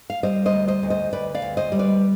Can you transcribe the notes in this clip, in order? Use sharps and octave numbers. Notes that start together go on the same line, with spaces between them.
F5
G3 C5 D#5
C5 D#5
D2
C5 D#5
D2
C5 D#5
D2 B4 D5
D5 F5
D2
C5 D#5
G3
B4 D5